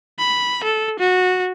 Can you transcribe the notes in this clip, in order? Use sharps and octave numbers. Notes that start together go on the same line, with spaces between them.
B5
A4
F#4